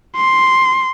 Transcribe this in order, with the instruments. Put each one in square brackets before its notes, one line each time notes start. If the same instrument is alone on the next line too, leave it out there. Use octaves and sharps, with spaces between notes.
[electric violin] C6